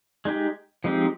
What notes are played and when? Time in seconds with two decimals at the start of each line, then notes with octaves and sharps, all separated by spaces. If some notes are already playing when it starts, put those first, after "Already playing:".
0.25 G#3 D#4 G4
0.84 F3 G#3 C4 D#4 G4